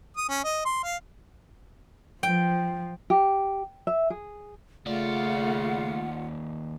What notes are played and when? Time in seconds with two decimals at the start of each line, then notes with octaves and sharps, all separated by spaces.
0.17 D#6
0.29 C#4
0.44 D#5
0.65 C6
0.84 F5
2.23 F3 G5
3.10 G4
3.87 E5
4.10 G#4
4.86 D#2 C#3 A3 F4 D5 F#5